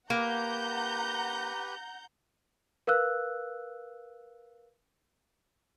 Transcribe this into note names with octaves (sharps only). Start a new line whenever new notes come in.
A#3 G4 B4 F#5 A#5 G6
A#4 B4 F5 E6 F#6